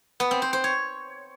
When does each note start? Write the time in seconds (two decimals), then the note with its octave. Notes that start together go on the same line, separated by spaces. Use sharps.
0.20 B3
0.31 C4
0.42 C5
0.53 C5
0.64 C#5